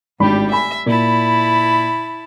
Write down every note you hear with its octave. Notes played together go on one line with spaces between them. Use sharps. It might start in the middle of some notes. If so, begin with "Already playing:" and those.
G#1 A2 G3 D4 G4 B5
E5 G#5 B5
A#2 E4 A5 B5